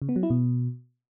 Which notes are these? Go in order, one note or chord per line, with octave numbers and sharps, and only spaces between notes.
C#3
B3
F#3
E4
B2